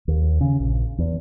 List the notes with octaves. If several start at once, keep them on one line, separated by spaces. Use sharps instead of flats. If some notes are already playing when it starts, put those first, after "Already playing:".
D#2
C#3
A#1
E2